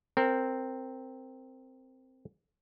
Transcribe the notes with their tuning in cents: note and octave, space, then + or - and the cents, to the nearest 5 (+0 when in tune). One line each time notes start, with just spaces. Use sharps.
C4 +0 A#4 -15